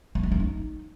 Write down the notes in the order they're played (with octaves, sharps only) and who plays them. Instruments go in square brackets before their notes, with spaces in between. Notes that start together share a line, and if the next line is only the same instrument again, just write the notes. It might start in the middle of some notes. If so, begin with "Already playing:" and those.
[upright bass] A#3
B3
A#3
D#4